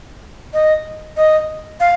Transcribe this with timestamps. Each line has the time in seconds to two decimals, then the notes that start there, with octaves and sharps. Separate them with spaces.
0.53 D#5
1.16 D#5
1.80 F5